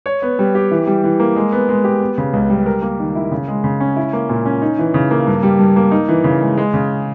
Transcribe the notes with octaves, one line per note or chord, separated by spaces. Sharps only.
C#5
B3
G3
G4
E3
G3
E3
A#3
G#3
B3
G#3
G4
B3
C#3
C#2
G3
A#4
A#3
D#3
E4
C#3
G#3
C#3
C#4
E4
A#3
A#2
C#4
D#4
E3
C#3
A#3
G2
G3
G2
A#3
D#4
E3
C#3
G#3
G#3
C#3